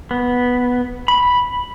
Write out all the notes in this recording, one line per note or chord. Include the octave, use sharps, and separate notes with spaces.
B3
B5